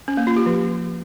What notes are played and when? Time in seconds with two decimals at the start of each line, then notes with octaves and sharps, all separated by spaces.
0.08 C#4
0.17 A#3
0.27 F4
0.37 G4
0.46 F3